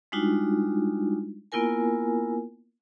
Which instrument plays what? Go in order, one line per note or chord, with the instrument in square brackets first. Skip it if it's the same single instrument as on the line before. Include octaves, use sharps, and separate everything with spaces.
[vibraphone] G3 G#3 D4 D#4 F4 F#4
A#3 B3 E4 F4 A#4 G#5